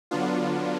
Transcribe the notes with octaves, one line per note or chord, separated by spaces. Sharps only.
D3 F#3 B3 D4 F4